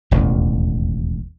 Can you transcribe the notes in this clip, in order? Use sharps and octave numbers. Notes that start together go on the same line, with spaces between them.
E1 A1 D#2